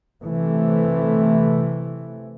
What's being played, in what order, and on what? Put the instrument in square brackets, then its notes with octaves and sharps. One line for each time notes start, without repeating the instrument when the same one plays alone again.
[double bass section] C3 E3 A3